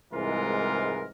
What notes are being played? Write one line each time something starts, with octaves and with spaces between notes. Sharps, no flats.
C2 G#2 E3 G#3 F4 A#4